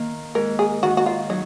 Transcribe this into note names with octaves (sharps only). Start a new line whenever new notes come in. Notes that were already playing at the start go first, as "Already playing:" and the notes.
Already playing: D#3 A#3
G#2 A#4
G#4
D#3 F#4
F#4
F4
F#3 D#4